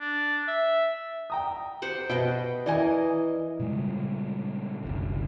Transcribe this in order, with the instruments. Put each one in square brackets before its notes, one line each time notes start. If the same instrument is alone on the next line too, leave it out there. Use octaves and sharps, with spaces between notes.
[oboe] D4
E5
[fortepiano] G5 A#5 D#6
[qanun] G4 C5 F#5
[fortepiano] B2 [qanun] B4 D#5 G5
[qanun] E3 A#4 D#5 [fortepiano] D5 G#5
[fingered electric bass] A#2 C#3 G3 G#3
F#1 C2 D3